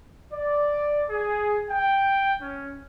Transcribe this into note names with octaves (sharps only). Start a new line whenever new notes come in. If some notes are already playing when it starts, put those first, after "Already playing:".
D5
G#4
G5
C#4